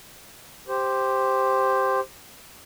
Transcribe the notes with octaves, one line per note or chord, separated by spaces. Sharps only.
G4 C5